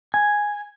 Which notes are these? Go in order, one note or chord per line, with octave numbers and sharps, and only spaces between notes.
G#5